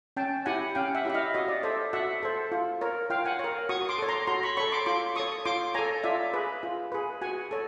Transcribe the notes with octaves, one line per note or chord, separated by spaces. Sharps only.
C#4 G5 A5
E4 G4 F#5 G#5
C#4 F5 G5
E5 F#5
E4 G4 E5
D#5 F5
F#4 C#5 D#5
D5
A4 C5 D5 E5
F#4 E5 F#5
A4 C5
F4
A#4 C#5
F4 F5 G5
F#5 G#5
A#4 C#5
F#4 C#6 D#6
C6 D6
A4 C#5
A#5 C6
F#4 A#5 C6
B5 C#6
A4 C#5 B5 C#6
C6 D6
F4 C6 D6
A4 C#5 C#6 D#6
F4 C6 D6
A4 C#5 G#5 A#5
F4 D5 E5
G#4 B4
F4
G#4 B4
F#4 F#5 G#5
A4 C#5